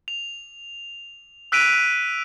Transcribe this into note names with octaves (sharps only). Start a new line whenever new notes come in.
F7
E6 F#6 B6 D7 D#7 F7